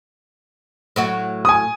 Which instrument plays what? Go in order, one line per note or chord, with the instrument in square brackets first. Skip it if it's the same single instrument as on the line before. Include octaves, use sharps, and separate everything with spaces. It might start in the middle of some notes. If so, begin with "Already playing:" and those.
[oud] A2 F#3 F#4
[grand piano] G#5 D#6